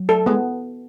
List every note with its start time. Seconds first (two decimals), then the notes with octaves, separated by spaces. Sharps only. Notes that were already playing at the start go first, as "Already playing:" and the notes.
Already playing: F#3
0.09 A4
0.26 G#3 B3